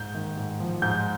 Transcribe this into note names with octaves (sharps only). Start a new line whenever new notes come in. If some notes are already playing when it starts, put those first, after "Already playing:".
Already playing: G#2 G6
D#3
G#2
F3
G#2 G6